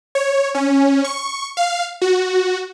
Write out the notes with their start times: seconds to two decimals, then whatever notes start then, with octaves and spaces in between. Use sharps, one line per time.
0.15 C#5
0.55 C#4
1.04 C#6
1.57 F5
2.02 F#4